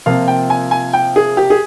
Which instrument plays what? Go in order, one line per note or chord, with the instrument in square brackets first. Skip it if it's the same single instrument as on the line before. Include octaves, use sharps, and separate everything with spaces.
[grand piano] C3 F3 A#3 F4 [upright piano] F5
[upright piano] G5
G#5
G#5
G5
G#4
G4
G#4